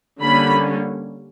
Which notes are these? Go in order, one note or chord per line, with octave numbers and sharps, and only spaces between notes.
D3 G3 A#3 C#4 B5